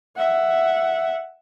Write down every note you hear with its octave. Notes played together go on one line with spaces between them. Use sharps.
E5 F#5